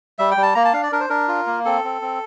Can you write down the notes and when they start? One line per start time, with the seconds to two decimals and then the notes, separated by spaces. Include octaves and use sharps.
0.19 G3 E5
0.31 G5
0.37 G3
0.43 A5
0.55 A#3 A#5
0.65 A5
0.73 D4 F5
0.83 D5
0.92 D4 A#4
1.00 C5
1.09 D4 A#4
1.28 F4
1.47 A#3
1.65 C4 A4
1.84 C4
2.02 C4